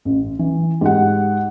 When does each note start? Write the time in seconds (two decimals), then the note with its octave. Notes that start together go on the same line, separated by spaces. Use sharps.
0.05 A1
0.39 E3
0.81 G#2 G4 F#5